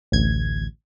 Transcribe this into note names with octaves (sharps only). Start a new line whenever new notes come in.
A1 D2 G#6